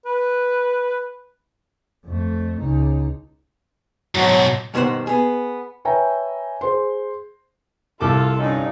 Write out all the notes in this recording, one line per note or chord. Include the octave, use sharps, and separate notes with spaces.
B4
F2 A3
C#2 D#4
G#2 B2 F#3
G2 B2 D#3 B4 C5 F#5
B3 G#4
B4 C#5 E5 G5 G#5 A#5
G#4 C5 C6
C2 F4 A4 D6
G2 D3 C#4 D#4